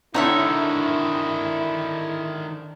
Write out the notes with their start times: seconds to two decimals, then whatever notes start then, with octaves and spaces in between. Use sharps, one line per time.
0.14 D3 D#3 C4 D#4 E4 C#5 E5